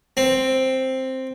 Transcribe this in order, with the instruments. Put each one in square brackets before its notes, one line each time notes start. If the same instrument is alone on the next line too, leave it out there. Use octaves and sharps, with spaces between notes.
[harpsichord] C4